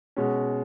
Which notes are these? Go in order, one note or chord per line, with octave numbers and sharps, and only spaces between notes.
B2 G#3 C#4